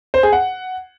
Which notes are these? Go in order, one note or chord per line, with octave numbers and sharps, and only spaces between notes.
C5
G#4
F#5